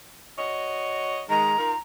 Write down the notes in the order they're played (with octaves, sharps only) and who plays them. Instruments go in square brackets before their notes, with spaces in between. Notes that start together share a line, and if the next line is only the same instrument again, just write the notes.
[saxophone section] F#4 C#5 D#5
[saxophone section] D#3 G#3 [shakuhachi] A#5
[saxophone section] D#4 F4 A#4